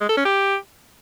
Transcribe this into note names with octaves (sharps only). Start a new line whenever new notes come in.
G#3
A4
C#4
G4